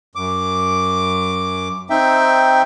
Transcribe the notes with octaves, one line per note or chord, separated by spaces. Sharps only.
F#2 D6
C4 D#4 E5 G5